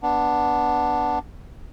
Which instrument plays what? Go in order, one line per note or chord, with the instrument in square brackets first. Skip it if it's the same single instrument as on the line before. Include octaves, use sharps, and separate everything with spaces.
[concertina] B3 D4